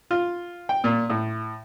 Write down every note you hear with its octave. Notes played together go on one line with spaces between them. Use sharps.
F4
G5
A#2
A2